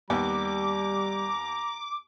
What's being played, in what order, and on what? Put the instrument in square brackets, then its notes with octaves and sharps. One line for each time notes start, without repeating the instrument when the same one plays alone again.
[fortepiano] D#2 B3 [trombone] G3 [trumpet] A#5 [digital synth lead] D6